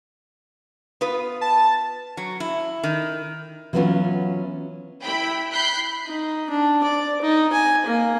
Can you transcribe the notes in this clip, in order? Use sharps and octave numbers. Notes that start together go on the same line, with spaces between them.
B3 F4 B4
A5
F#3
E4
D#3
E3 F#3 A3 B3 C#4 F4
E4 G5 B5
B5 F#6 G6 B6 C7
D#4
D4
D5
D#4
G#5
A#3